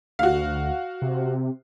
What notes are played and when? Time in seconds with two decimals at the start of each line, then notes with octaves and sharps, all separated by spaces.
0.19 D2 F#4 F5
1.02 C3